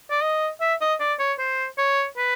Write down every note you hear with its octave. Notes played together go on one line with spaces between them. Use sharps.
D5
D#5
E5
D#5
D5
C#5
C5
C#5
B4